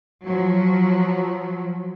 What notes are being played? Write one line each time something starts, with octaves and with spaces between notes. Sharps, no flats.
F3 F#3